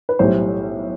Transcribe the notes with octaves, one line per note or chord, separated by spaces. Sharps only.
B4
B1 A2 G3 C5